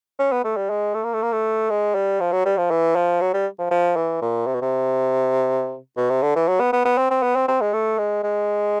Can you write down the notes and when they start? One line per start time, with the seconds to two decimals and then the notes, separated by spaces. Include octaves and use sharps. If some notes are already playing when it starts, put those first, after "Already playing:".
0.19 C#4
0.32 B3
0.44 A3
0.57 G3
0.70 G#3
0.94 A3
1.04 A#3
1.13 A3
1.23 A#3
1.32 A3
1.70 G#3
1.95 G3
2.20 F3
2.32 F#3
2.45 G3
2.57 F3
2.70 E3
2.95 F3
3.21 F#3
3.34 G3
3.58 F3
3.71 F3
3.96 E3
4.21 A#2
4.47 C3
4.54 B2
4.62 C3
5.97 B2
6.10 C3
6.22 D3
6.36 E3
6.48 F#3
6.60 B3
6.73 B3
6.85 B3
6.98 C4
7.10 C4
7.22 B3
7.36 C4
7.48 C4
7.61 G#3
7.73 A3
7.98 G#3
8.23 G#3